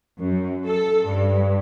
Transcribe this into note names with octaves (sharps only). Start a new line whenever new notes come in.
F#2
A4
G2